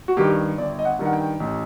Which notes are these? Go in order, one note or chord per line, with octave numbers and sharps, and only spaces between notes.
F#4
G2 D#3 G4
G1 D5
D#5
F#5
G2 D#3
F#5
G5
A1